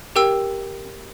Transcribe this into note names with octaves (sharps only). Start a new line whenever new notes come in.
G4 A#4 G5 E6